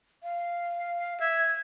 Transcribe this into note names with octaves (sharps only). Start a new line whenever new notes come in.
F5
E5 G#6